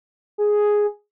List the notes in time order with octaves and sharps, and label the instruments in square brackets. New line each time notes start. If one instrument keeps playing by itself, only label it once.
[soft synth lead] G#4